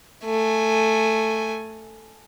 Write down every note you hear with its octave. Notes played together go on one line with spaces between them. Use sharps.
A3 G#5